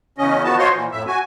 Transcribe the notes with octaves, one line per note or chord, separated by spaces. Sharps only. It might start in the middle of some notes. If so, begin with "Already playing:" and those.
E2 C#3 C#4 D#5
D#3 F3 B3 F#4 A5
F4 F#4 C5 C#5 D#5 C6
A#2 E3 F3
F2 A2 E5
F#4 G#5